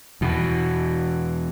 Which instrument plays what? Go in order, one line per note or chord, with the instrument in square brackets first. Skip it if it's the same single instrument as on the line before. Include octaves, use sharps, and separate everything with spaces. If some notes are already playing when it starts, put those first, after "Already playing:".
[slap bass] E2 B2